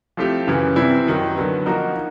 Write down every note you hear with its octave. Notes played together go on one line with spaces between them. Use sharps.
F3 A3 C4 E4 G4
F#2 C#3 E3
C3 E3 G3 C4 E4
F#2 D#3 F#3
D3 F#3 B3
F3 A#3 D#4 F#4 A#4